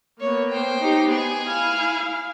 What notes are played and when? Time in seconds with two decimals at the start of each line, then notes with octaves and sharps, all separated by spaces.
0.21 A#3 B3 C#5
0.50 C5 G5
0.80 D#4 G4
1.10 B3 G#4 G#5
1.47 E4 F5